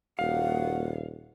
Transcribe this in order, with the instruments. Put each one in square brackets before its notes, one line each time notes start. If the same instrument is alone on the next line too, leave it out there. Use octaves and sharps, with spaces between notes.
[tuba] D#1 [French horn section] A#3 F#4 [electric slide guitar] F5 [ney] F#5